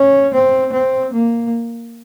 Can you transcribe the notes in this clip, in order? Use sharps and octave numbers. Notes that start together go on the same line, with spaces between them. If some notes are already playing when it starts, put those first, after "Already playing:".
Already playing: C#4
C4
C4
A#3